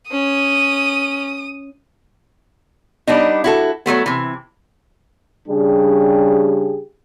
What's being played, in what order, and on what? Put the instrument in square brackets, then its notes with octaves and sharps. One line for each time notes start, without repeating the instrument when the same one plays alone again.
[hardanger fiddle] C#4 [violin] D#6
[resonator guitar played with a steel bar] G3 B3 D4 D#4
E4 F#4 A4
F#3 G#3 A3 B3
C3 E3
[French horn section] C#3 G3 D4 G4 G#4